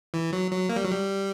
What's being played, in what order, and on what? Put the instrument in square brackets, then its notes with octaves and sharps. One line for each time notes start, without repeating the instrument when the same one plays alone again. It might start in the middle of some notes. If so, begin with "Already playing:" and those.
[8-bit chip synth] E3
F#3
F#3
A#3
G3
F#3
G3